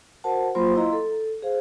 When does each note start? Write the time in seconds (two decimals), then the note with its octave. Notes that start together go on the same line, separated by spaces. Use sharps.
0.24 F#4 A#4 C5 F#5 A5
0.55 F#3 A#3 F4 C5 B5 C6
0.76 E4 D#5 F5 A#5 C6
0.93 A4
1.42 G#4 C5 F5